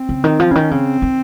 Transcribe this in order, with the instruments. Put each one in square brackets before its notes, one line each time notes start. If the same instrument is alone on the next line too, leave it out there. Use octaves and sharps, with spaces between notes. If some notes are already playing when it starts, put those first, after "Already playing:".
Already playing: [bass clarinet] C4
[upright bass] C#3
D#3
F3
C#3
[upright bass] D#3 [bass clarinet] C#4
[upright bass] C#3 [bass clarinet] C4
[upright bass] D#3